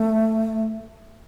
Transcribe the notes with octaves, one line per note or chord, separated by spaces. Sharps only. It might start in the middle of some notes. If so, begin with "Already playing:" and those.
Already playing: A3